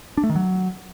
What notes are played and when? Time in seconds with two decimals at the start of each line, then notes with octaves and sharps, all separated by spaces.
0.17 D4
0.23 A3
0.30 D#3
0.36 F#3